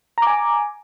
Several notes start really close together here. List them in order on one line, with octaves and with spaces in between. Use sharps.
A#5 D6 G#5